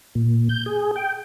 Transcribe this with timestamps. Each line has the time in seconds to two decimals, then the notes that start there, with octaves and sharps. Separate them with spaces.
0.15 A#2
0.49 G6
0.66 G#4
0.96 G5